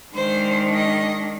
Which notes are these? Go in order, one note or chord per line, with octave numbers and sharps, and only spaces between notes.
D#3 G#3 D4 C5
D#5